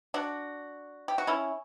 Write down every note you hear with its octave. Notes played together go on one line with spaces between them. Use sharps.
D4 F#4
G4
F#4
C#4 E4